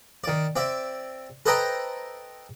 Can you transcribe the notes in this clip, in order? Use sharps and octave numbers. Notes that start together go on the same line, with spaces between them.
D#3 D5
C4 D5 E5
A4 B4 C5 D#5 G5 A#5